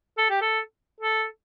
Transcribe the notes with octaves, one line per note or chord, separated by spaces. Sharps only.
A4
G4
A4
A4